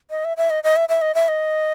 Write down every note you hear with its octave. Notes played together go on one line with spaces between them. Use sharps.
D#5
E5
E5
D#5
D#5
E5
E5
D#5
E5
D#5